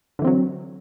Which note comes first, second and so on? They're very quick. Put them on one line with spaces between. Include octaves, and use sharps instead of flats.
D3 E3 C4 F#3